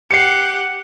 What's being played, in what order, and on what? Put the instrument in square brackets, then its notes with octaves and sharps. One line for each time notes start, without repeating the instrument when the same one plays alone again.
[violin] G4 F#5 [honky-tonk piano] C7 C#7